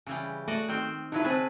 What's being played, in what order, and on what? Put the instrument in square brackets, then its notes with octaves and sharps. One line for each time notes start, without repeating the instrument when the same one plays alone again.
[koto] C#3 E3 G3
[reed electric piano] A3 [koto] F#4 D5 D#5
[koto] D#3 C4 G5
[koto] D3 F#3 B4 [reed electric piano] D#4 E4
[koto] C3 G#4 B4 [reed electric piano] C4 A5